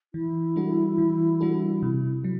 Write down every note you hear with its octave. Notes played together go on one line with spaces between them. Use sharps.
E3 E4
G3 D4 F#4 A4
E3
G3 D4 F#4 A4
C3
F#3